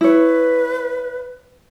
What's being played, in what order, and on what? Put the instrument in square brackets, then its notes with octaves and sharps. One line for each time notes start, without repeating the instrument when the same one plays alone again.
[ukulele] E4 C#5 [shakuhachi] B4